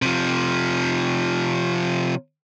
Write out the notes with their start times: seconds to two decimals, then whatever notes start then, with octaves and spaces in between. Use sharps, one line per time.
0.02 C3 F3